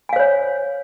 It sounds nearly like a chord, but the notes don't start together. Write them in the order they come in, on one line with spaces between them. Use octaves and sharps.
G#5 F5 C5 C#5